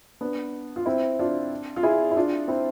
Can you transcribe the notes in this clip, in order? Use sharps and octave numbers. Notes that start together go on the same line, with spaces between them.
B3 D4
F4
C4 E4
D4 F4
F4
E4 G#4
E4
D4 F4
C4 E4